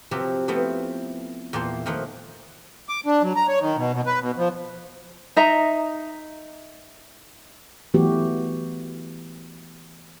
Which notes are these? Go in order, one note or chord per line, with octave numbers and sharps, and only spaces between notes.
C3 F3 F#3 G4 E5
F3 A3 B3 C4 E4
E2 A#2 A#3 G5 A5 C6
A#2 D#3 F3 F#3 A3
D6
D4
F#3
A#5
C#5
D#3
B2
B2
B4
B2
F3
D#4 D#5 E5 A#5
E3 F#3 A3 B3 F#4 G4